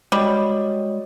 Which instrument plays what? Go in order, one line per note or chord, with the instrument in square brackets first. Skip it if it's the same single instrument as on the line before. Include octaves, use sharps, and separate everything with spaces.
[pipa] G3 [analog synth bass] G#3 [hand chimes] F#4 C#5 D#5